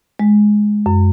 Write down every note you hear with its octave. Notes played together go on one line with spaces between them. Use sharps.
G#3
F#2